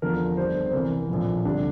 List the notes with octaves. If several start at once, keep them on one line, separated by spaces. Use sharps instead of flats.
E2 D3 F3 A#4
G1 G2 D3 G3 C5
C5
C2 C3 E3 A#4
A#1 A2 F3
D2 C3 G3 D4